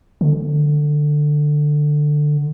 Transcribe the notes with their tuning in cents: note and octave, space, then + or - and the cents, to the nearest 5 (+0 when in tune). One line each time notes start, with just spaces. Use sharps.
D3 +15